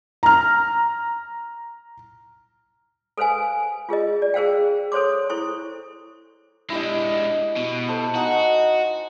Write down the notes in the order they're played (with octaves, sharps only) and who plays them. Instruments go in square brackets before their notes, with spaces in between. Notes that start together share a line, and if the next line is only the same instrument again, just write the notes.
[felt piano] A#5 F6
[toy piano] A4 B4 C5 F5 G#5
F4 G#4 A#4 D#5
D5
G#4 A#4 C5 F5 G5
A4 C5 C#5 C6 D6
E4 A4 C5 C#6
[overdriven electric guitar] G#3 D4 [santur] E4 G4 D#5
[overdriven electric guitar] B2
[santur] A4 C5
[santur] D#4 F#5 G#5 [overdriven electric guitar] F#4